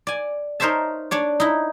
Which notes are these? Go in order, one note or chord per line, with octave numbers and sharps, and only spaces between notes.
D5 G#5
D#4 A#4 C5 C#5 E5 A5
D4 C#5 D5
D#4 E4